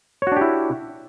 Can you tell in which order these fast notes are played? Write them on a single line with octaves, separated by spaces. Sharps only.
C#5 F#4 D4 G4 E4